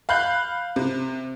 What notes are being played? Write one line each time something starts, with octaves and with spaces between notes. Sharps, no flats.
F5 B5 F#6 G6
C3